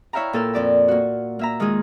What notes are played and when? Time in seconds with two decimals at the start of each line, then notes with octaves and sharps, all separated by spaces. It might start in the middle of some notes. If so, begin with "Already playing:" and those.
0.13 E4 C#5 E5 F5 G5 A#5
0.33 A#2 A4 A#4 E6
0.53 F2 D5 E5
0.88 A#3 F#4
1.39 A#3 E5 A#5
1.60 D#3 G#3 F4 G#4